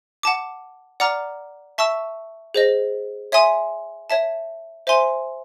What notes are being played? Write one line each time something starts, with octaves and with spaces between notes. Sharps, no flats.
F#5 A5 D6
D5 F#5 A#5 D6 F6
E5 A5 C#6 E6
G#4 C5 D#5
C#5 E5 G#5 C6 D#6
C#5 E5 A5
C5 E5 G#5 C6